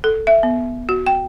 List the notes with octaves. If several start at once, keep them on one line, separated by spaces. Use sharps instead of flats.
A4
E5
B3
F#4
G5